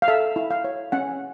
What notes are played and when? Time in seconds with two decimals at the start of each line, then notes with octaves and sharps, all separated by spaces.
0.02 F5
0.08 A4 E5
0.36 E4
0.51 F5
0.64 C#5
0.92 C#4 F#5